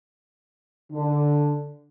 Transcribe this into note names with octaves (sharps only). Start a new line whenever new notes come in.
D3